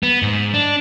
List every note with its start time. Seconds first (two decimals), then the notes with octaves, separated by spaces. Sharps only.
0.03 B3
0.22 G#2
0.54 D4